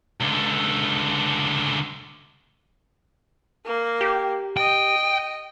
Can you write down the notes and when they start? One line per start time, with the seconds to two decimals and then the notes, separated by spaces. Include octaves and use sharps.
0.21 C#2 D3
3.66 A#3
4.01 G4
4.57 D#5 G5